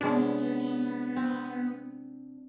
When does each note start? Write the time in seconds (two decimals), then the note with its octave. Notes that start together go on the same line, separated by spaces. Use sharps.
0.01 C3 G#3 B3 C#4 D4
1.16 C4